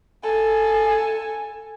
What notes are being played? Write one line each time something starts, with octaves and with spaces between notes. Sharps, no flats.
A4 G#5